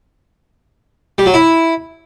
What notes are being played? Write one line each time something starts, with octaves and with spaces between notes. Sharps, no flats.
G3
F#3
E4